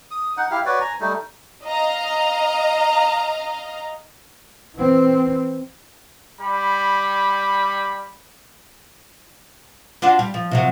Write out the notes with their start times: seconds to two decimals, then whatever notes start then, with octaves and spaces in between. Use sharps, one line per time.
0.11 D#6
0.37 D#4 F#5
0.51 E4 G4 F5
0.66 F#4 B4 C#5 D5
0.81 G#5 A#5
1.00 G3 A3 D#4
1.64 D#5 F5 A#5
4.76 E3 C4
6.41 G3 B5
10.02 D4 F4 F#4
10.19 G3
10.34 F3
10.51 C3 F3 F#3